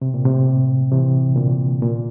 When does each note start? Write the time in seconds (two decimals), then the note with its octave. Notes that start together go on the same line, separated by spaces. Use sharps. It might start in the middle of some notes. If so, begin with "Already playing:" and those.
0.02 C3
0.14 A#2
0.25 A2 C3
0.91 C3 E3
1.36 A#2 D3
1.82 A#2